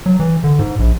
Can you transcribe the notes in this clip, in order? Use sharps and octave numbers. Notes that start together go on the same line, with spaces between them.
F#3
E3
D3
G#2
A#1